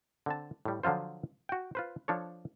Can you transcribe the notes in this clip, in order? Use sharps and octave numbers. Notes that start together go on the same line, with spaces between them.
D3 C4 A5
A2 G3
D3 F3 F#3 F4 C5
F#4 G5
F4 B4 C5
F3 D4 A4 C#5